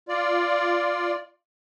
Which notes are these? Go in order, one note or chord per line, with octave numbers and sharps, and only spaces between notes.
F4 D5